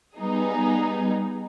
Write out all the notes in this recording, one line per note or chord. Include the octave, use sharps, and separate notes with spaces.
G3 B3 D#4 G#4